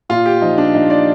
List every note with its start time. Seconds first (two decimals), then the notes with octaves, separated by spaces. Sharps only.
0.09 A#2 F4
0.26 G4
0.42 F3 D#4
0.58 D4
0.74 A#2 D#4
0.90 D5